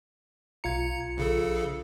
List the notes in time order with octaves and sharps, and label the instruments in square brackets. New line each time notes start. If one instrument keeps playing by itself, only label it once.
[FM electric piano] B1 F4 C#7 [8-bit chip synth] A#5 G#6
[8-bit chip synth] A#1 C#3 A4